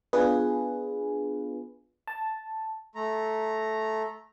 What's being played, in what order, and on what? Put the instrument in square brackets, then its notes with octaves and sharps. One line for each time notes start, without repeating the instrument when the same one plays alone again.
[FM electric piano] B3 D4 F4 G#4 B4
A5
[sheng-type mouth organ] A3 A#5